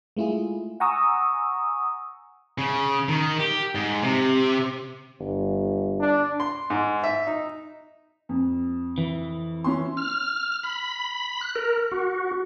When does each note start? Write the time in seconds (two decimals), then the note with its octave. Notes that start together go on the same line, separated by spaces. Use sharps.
0.17 G#3 A3 E4 F4 G#4
0.80 F#5 G#5 A#5 C#6 D#6 E6
2.58 C#3
3.09 D#3
3.40 G4
3.75 G#2
4.03 C3
5.20 G1
6.00 D4
6.40 C6
6.70 G#2
7.04 E5
7.27 D#4
8.29 F2
8.98 E3
9.64 C#4 E4 C6
9.97 F6
10.63 B5
11.41 F#6
11.56 A#4
11.92 F#4